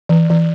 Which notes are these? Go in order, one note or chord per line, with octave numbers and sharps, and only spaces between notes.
E3
E3